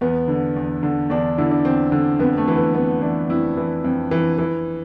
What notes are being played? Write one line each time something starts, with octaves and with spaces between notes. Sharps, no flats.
E2 B3
D3
E2
D3
E2 D4
D3 E4
D4
E2 C4
D3
F2 B3
A3
E3
B3
F2 B3
E3 D4
F2 E4
E3
F2
E3
E3